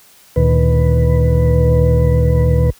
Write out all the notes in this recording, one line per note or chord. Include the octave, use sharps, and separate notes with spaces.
D2 A#2 D#3 B4